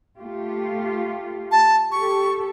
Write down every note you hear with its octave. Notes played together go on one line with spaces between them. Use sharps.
A3 F4 G4
A5
G4 A4 C#6